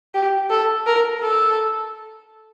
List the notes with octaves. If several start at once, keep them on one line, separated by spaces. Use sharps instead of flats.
G4
A4
A#4
A4